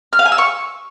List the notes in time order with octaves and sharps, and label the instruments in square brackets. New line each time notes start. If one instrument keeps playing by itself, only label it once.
[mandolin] F6
F5
G#5
E6
C#6